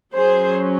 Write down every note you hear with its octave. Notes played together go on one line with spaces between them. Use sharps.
F#3 C#4 G#4 C5